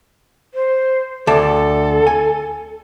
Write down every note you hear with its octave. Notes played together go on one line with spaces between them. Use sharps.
C5
D2 A4 D5 A5
G#5